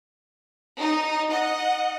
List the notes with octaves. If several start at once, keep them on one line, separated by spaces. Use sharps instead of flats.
D#4
D#5 F#5